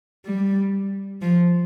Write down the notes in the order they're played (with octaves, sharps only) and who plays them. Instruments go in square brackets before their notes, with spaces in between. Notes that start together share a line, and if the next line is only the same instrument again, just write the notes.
[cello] G3
F3